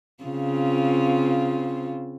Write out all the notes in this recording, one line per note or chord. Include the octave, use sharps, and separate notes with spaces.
C#3 C4 F4